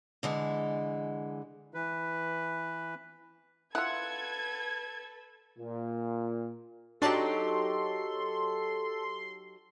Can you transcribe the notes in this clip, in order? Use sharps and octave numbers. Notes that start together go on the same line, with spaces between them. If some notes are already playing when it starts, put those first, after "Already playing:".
D3 E3 G#3
E3 B4
E4 F4 A4 B4 F#5 G#6
A#2
F#3 D4 D#4 G4 A4 D5 A5 C6